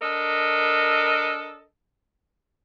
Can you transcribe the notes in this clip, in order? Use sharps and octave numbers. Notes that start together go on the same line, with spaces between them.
D4 A4 A#4 D#5